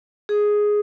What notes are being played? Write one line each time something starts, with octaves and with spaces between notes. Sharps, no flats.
G#4